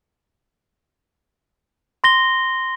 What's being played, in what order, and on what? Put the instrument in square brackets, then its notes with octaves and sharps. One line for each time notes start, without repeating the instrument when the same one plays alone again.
[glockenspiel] C6 A#6 G7